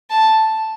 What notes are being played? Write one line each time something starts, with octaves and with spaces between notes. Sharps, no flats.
A5